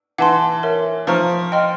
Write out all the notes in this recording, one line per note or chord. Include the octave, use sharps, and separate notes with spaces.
E3 F#5 A5 C6
A#4 C#5 E5
F3 F5 A#5 C#6 F6
D#5 G5 C6 F6